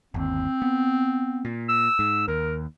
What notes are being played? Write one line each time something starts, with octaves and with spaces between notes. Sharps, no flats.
G1 D#2 C4
B3
A#2
E6
G#2
D#2 A#4